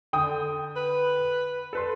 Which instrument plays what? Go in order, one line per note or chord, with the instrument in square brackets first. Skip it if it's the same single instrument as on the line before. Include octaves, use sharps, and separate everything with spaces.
[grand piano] D3 G5 D#6
[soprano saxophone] B4
[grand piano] A4 B4 C6